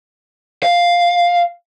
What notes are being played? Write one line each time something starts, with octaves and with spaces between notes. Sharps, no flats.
F5